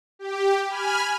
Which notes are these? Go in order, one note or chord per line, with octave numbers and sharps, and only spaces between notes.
G4
G#5 B5 F6